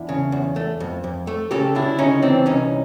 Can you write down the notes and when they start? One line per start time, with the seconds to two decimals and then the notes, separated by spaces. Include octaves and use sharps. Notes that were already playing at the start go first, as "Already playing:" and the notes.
Already playing: E2 D4 E4
0.09 C#3
0.32 E2
0.56 A3
0.80 F2
1.04 F2
1.27 A3
1.51 C#3 G4 A4
1.75 D2 D4 E4
1.99 C#3 C#4 D#4
2.22 E3 C4 D4
2.46 C2 C#4 D#4